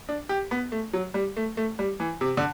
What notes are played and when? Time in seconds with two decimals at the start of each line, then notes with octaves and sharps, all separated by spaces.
0.09 D4
0.29 G4
0.51 B3
0.72 A3
0.93 F#3
1.14 G3
1.37 A3
1.57 A3
1.79 G3
2.00 E3
2.21 C3
2.37 D3